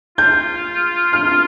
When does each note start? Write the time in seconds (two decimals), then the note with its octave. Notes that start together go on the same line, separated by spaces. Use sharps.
0.18 F4 G6
1.13 F6